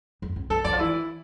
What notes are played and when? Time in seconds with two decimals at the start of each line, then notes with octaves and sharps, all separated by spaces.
0.22 F2
0.36 C#3
0.50 D3 A4
0.64 E3 D5
0.72 F3
0.79 E3 E4